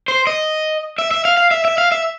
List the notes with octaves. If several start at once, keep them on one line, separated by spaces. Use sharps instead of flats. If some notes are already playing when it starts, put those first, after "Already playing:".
C5
D#5
E5
E5
F5
F5
E5
E5
F5
E5